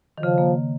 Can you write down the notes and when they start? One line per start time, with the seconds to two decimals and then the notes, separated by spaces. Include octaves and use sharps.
0.18 D#3
0.23 C#3 F3
0.38 A#3